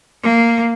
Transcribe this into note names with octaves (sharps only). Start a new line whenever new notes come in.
A#3